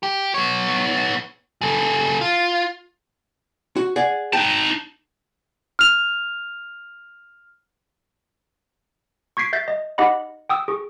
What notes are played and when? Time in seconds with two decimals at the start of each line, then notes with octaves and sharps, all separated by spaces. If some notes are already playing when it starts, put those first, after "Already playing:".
0.03 G4
0.34 B3 C#5
1.61 C#3 A4
2.21 F4
3.76 F#4
3.96 G#4 D5 F#5
4.33 D#4 G5 A5
5.79 F6 F7
9.37 C#6 G#6 B6 C7 D7
9.53 E5 G6 A6 C7
9.68 D#5
9.98 D#4 G4 D#5 F#5 B5
10.49 G5 D#6 E6
10.68 G#4 C#6